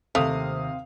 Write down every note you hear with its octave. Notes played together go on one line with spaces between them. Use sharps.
D#2 C3 A3 C4 F5 D#6 F7